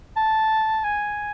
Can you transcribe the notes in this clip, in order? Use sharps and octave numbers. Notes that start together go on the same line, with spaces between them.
A5
G#5